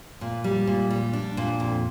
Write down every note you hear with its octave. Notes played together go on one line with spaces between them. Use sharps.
A#2
G3
A#2
G3
D4
A#2
F2